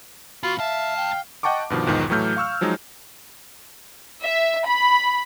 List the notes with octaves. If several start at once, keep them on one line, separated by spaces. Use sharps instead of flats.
D3 B3 F4 F#4
D2 E5 F5 A5
G5
D#5 F#5 G5 A5 C#6 D6
G2 B2 D#3 F3
B1 E2 G#2 D#3 F3
A2 E3 F#3 A3 F6 G6
F5 C#6 E6 F6
F3 F#3 G#3 D#4
E5
B5